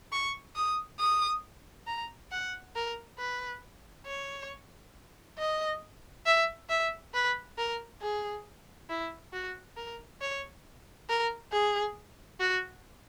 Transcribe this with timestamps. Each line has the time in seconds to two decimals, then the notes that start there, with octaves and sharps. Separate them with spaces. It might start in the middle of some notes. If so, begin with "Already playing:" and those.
0.12 C#6
0.56 D#6
0.99 D#6
1.87 A#5
2.32 F#5
2.75 A#4
3.19 B4
4.06 C#5
5.38 D#5
6.26 E5
6.69 E5
7.14 B4
7.58 A#4
8.01 G#4
8.89 E4
9.33 F#4
9.77 A#4
10.21 C#5
11.09 A#4
11.52 G#4
12.39 F#4